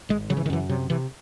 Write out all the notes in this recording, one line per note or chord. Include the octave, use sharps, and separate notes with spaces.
G#1 G#3
C#3 F#3
E3
D#3
F#2 E3
C3 F#3
C3 E3